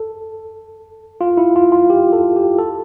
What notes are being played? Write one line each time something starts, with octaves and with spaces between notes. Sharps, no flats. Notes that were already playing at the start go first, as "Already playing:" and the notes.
Already playing: A4
F4
E4
F4
F4
G4
A4
G4
A4